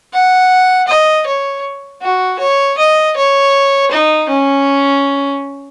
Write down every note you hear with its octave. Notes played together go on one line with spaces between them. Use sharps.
F#5
D#5
C#5
F#4
C#5
D#5
C#5
D#4
C#4